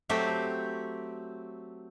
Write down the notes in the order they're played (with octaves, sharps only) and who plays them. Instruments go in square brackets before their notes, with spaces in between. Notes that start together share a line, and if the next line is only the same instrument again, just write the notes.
[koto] F#3 A3 C4 G4